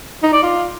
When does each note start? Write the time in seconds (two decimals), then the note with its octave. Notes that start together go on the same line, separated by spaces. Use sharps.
0.23 D#4
0.33 D5
0.43 F4